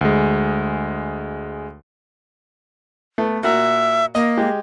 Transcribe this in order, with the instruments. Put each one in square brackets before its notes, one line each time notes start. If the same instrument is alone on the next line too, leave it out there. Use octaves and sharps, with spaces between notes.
[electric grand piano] D2 G#3
[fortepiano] A3 B3
[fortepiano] A#2 F#4 A#4 [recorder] E5
[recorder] A#3 [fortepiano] D#5
[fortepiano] G#3 G4